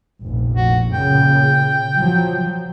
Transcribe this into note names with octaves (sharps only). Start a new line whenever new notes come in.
F1 A#1
F#4
A#2 C#3 G5
F3 F#3